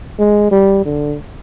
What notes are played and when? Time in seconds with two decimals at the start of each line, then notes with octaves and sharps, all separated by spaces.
0.19 G#3
0.51 G3
0.86 D3